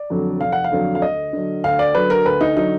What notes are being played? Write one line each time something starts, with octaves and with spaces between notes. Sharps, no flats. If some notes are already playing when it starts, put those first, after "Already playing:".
Already playing: D5
F2 D3 F#3
F1 F5
F#5
F5
F2 D3 F#3
F5
D2 D#5
D3 F#3
D2 F5
D5
D3 F#3 B4
A#4
D2 B4
D#4
D3 F#3 D#4